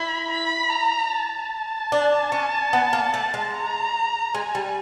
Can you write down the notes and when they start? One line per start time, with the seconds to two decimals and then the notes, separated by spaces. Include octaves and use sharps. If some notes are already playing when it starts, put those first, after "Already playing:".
Already playing: E4 B5
0.30 B5
0.70 A#5
1.10 A5
1.92 D4
2.32 C#4
2.73 B3
2.93 A#3
3.14 A3
3.34 G#3
3.54 A#5
4.34 G#3 G#5
4.55 G3